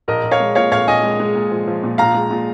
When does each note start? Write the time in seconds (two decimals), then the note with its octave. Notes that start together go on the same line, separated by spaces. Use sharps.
0.08 A#1 A#4 D#5
0.23 A#1
0.31 C#5 F5
0.40 G#3
0.55 A#2 C#5 F5
0.71 A#1 C#5 F5
0.88 A#1 D#5 G#5
1.03 G#3
1.20 G#3
1.35 A#2
1.51 F3
1.67 F3
1.83 A#2
1.98 A#1 F5 A#5
2.14 G#3
2.31 A#2